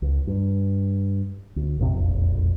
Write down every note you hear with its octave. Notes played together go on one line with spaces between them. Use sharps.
C#2
G2
D2
A#1 F2 C3
E1 A#1 F2